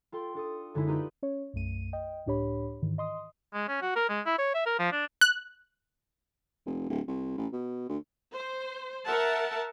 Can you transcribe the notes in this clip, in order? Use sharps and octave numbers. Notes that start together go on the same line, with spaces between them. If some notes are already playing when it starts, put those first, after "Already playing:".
F4 A4 G5 C6
D4 A4 D#6
F#2 D3 G#3 D#4 E4
D#4 F4 G4 B4 A#5 B5
C#4 C#5
B1 F#2 A3 D#7
D#5 G5
C#2 A2 D4 G4 C#5 B5
G#2 D#3 E3
D#5 C6 D#6
G#3
C#4
F#4
A#4
G#3
E4
C#5
E5
A#4
F3
D4
F#6
F1
D1
C2
A1
B2
D2
C5
A#4 E5 F#5 A5